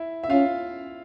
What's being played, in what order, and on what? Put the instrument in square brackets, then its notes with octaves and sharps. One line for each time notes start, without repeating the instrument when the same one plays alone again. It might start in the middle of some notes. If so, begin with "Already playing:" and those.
Already playing: [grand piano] E4 E5
E5
[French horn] C#4 [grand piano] F4 F5